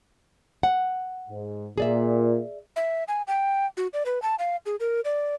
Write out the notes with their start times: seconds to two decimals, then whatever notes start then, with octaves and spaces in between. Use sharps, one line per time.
0.63 F#5
1.30 G#2
1.78 A#2 G#4 D5 E5
2.76 E5
3.08 G#5
3.27 G5
3.77 F#4
3.93 D5
4.06 B4
4.22 A5
4.39 F5
4.66 G#4
4.80 A#4
5.05 D5